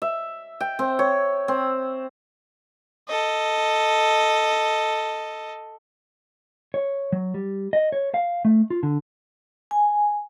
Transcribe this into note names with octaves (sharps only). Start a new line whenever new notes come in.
E5
G5
C4
C#5
C4
A4 D#5
C#5
F#3
G3
D#5
C#5
F5
A3
F4
D3
G#5